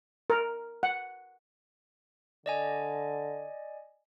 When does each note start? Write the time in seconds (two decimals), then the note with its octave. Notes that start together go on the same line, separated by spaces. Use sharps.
0.30 A#4
0.83 F#5
2.46 D3 D5 D#5 G#5